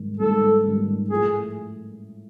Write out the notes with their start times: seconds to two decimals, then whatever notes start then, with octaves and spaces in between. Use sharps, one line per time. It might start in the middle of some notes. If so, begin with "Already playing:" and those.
Already playing: G#2 D#3 G3
0.20 G#2 D#3 G3 A4
0.65 G#2 D#3 G3
1.11 A2 F3 A3 G#4